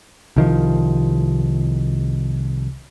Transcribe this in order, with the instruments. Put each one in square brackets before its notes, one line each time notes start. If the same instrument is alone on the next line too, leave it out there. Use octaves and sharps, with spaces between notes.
[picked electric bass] C2 D#3 F3